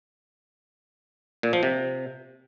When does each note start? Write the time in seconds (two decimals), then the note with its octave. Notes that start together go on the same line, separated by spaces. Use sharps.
1.43 A#2
1.53 F3
1.63 C3